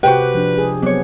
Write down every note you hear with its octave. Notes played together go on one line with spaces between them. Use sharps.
C3 F#4 G4 B4 C5 G5
F3 D4
G#4
F#3 B3 C4 D4 C#5